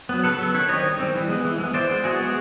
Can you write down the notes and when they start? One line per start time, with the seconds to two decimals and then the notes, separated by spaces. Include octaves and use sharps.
0.09 F#3 B3
0.24 C#3 A4 B4
0.38 F#3 B3
0.54 D#3 B4 C#5
0.68 G3 C4 C#5 D#5
0.83 D#3
0.99 G3 C4
1.15 E3
1.28 G#3 B3
1.45 E3
1.58 G#3
1.64 B3
1.74 E3 C5 D5
1.90 G#3 B3
2.04 E3 F#4 G#4
2.19 G#3 B3